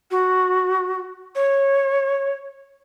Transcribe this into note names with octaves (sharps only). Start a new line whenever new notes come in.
F#4
C#5